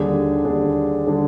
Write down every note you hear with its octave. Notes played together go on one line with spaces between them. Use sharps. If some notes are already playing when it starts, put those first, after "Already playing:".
Already playing: D#2 D3 G3 D4 G#4
D#2 D3 G3 D4 G#4
D3 G3 D4 G#4